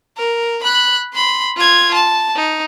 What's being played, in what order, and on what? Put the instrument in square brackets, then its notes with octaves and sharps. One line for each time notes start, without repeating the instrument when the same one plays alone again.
[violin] A#4
B5 F#6
B5 C6
F4 G#6
A5
D#4